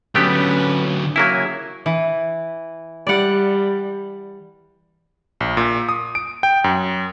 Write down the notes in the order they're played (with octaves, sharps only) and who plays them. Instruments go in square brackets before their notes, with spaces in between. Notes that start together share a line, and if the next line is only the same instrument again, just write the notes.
[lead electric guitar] D3 F#3 [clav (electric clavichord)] A3 B3 G4 [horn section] C#4 B4
[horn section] C#3 G#5 [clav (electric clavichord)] F#3 A#3 E4
[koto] E3
[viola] G3 [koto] D5 F#5
[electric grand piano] A#1
A#2
D#6
D7
G5
F#2